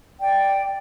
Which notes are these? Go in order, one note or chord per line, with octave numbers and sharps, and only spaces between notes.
D5 G5